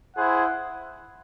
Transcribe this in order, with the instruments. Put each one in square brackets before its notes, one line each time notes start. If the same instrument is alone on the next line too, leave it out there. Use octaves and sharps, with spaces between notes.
[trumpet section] E4 G#4 C5 F#5